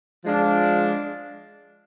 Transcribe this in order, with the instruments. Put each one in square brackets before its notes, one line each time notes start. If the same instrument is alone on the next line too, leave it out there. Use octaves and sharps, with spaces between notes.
[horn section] F3 G#3 D4 F4